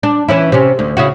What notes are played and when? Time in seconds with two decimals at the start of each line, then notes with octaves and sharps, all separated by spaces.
0.03 D4
0.29 E3 C#4 E4
0.52 C3 C#4
0.79 D2
0.97 C#3 E4 F#4